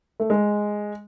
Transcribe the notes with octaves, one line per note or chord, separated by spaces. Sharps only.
A3
G#3